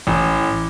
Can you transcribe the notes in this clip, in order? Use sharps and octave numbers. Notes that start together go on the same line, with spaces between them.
A1